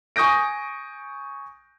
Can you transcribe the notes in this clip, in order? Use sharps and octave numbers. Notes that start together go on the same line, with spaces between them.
G#5 C#6 D#6 G6 A#6 D7